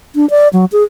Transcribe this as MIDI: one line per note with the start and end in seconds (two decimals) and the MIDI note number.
0.15 0.28 62
0.30 0.48 74
0.53 0.65 54
0.72 0.83 68